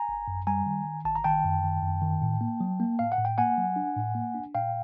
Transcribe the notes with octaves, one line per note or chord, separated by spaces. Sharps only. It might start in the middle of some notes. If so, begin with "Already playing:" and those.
Already playing: G#5 A#5
G#1
F#2
G3 G#5 A#5
D#3
D#3
G#1 A5
A#5
D#3 G5 A5
F#2
D#3
F#2
D#3
A2
A#3
F#3
A#3
A2 F5
F#5
A2
G5
A#3 F#5 G#5
F#3
D4
A2
A#3
D4
A#2 F5 G5